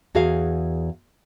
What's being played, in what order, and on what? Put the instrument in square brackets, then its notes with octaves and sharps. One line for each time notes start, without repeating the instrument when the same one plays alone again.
[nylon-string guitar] E2 F#4 G#4 F5